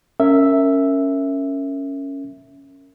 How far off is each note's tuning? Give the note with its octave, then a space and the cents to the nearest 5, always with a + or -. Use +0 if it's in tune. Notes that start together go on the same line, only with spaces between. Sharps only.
C#4 +0 A#4 -20 E5 +0